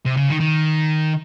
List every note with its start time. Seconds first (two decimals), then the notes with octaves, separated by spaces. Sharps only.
0.06 C3
0.17 C#3
0.30 D#3
0.40 D#3